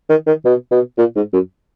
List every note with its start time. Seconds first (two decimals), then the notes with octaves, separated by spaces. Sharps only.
0.10 D#3
0.27 D#3
0.45 B2
0.71 B2
0.98 A#2
1.16 G#2
1.33 F#2